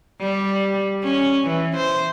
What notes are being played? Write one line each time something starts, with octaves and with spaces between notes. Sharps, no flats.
G3
C#4
E3
C5